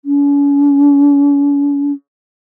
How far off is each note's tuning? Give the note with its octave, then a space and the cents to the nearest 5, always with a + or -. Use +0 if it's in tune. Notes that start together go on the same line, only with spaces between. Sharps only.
C#4 +40